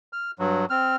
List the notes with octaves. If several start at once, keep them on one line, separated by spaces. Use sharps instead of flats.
F6
G2 F#3
C4 F6